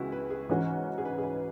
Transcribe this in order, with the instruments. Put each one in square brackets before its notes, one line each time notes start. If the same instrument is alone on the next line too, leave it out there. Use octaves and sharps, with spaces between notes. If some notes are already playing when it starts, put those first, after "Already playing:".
Already playing: [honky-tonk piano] C#2 C#3 [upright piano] E3 B3 E4 F#4
[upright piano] B4
G#4
[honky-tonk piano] G#2 E3 C#4 F#4
[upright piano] G#4
B4
G#4
B4